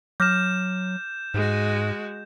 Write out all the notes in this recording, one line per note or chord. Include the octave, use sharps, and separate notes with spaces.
F#3 D6 F6 G6 A#6 E7
G#2 G#3 F#4